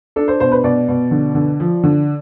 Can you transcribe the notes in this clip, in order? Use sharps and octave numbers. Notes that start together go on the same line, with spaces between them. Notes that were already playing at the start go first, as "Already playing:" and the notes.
D4 A4
C5
B2 C5
B4
B2 D5
B2
D3
D3
F3
D3